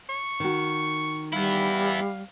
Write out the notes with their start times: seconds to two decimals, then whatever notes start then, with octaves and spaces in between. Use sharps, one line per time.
0.09 C#6
0.40 D#3 F#4
1.33 G3 B3 E4 F5